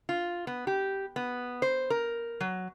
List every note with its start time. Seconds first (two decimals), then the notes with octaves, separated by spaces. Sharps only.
0.09 F4
0.47 B3
0.67 G4
1.16 B3
1.62 C5
1.90 A#4
2.41 F#3